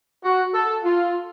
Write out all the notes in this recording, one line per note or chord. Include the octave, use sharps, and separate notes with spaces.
F#4
A4
F4